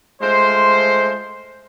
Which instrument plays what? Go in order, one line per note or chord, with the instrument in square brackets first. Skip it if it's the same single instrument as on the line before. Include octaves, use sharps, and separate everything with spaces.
[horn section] G#3 A3 F4 C5